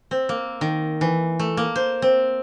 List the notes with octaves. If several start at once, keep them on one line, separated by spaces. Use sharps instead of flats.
C4
A#3
D#3
E3
A3
A#3
C5
C4